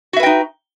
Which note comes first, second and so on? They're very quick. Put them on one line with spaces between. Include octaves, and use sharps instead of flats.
F#4 E5 B4 G5 D#4